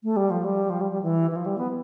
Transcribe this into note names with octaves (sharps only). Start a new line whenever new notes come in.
A3
G3
F3
G3
F3
G3
G3
E3
E3
F3
G3
B3